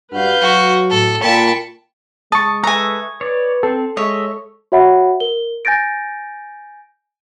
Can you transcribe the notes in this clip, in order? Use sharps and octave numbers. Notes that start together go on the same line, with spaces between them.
G2 F#4 B4 F5 G6
F#3 F#4
A2 A4
A#2 G5 A5 B5 C#6
G#3 A5 C#6 D#6
A4 B4 E5 G#5 A#5
B4 C#5 D5
C4 A4
G#3 C#5 D#5 E5
F#4 C#5 E5 F#5 B5
A#4 G7
G#5 G6 A6 A#6 D7